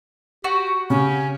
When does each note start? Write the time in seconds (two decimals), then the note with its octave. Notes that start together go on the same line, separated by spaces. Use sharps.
0.44 F#4 G4
0.90 C#3 C#4 G4